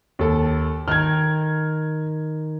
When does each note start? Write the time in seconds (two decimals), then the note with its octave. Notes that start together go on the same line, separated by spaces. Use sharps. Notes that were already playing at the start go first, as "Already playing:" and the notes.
0.19 D#2 A4
0.88 D#3 G5 F6 G#6